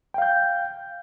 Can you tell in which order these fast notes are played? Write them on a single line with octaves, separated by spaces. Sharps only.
G5 F5 G6